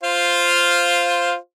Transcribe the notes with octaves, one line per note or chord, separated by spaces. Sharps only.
F4 C5 F5